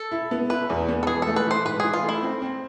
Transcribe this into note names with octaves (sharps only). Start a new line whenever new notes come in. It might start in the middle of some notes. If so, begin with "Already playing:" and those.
Already playing: A4
E4
B3
E4 B4
E2
B3
A4
E3 G#4
A3 A4
B4
E3 C5
G#2 B4
E3 G#4
F4
A3
E4
C4
C4